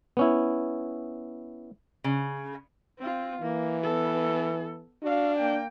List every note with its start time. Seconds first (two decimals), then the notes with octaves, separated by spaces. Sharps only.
0.17 B3 C#4 E4
2.04 C#3
2.99 C4 F4
3.42 E3 A#3
3.83 B3 A4
5.03 D4 F#4 F5
5.37 A#3 G5